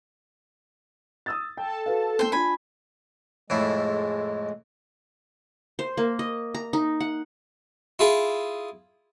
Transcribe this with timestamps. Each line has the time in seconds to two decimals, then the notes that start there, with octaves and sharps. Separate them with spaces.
1.26 D#6 E6 A6
1.57 A4 G5 A5
1.86 F#4 B4 F5
2.19 A#3 A4 C5 G5
2.32 D4 F4 G#5 B5
3.50 F2 A2 G#3 E4
5.79 C5
5.97 A#3
6.19 D#5
6.54 A#5
6.73 D#4
7.00 F#5
7.99 E4 F4 G#4